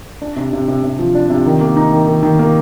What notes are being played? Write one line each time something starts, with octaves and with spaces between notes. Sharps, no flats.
D4
C3
C3
C3
C3
F3
D4
C3
D#3
A#3
D#4
D#3
D#3
D#3
A#3